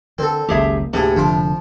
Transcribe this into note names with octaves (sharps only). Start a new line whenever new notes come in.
D3 C4 A4 A#4
F#1 C#2 D#3 A#3 G4 G#4 E5
D2 A2 C3 A#3 G#4 D#6
F1 D3 F3 C6 D6